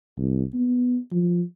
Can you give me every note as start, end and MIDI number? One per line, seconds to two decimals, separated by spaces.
0.18 0.43 36
0.54 0.98 59
1.12 1.42 53